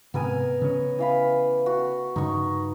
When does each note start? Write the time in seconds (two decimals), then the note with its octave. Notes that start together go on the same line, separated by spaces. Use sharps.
0.14 G#2 C3 B3 A#4 G#5
0.61 C#3 C#4
0.99 E3 F5 B5
1.66 F#4
2.16 G2 C#3 D#4 C#6